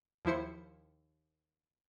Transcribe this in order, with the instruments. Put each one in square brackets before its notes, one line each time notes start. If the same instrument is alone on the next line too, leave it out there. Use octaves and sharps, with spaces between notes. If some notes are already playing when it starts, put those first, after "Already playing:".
[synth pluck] D#2 F3 E4 C5 C#7